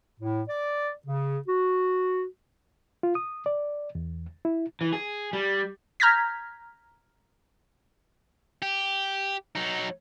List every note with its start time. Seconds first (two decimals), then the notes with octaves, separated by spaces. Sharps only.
0.20 A2
0.49 D5
1.06 C#3
1.48 F#4
3.03 F4
3.15 D#6
3.46 D5
3.95 E2
4.45 E4
4.81 E3
4.93 G#4
5.33 G3
6.00 A#5 F6 G6 G#6 A#6 B6
8.62 G4
9.55 F#3 D#4